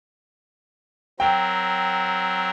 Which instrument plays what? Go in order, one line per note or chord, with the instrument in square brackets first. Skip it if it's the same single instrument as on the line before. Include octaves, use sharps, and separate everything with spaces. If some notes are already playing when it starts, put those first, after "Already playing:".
[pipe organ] F#3 C4 A#4 [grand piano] G5